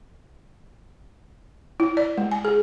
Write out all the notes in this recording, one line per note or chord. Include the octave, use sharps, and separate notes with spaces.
E4
D5
G#3
G#5
G#4